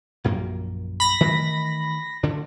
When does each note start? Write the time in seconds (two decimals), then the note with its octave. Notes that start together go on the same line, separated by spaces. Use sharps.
0.24 A#1 F#2 A#3
1.00 B5 A#6
1.21 D#3 E3 A3
2.23 D2 D3 D4